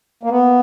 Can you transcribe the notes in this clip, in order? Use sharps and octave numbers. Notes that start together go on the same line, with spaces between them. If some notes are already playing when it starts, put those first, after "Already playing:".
A#3
B3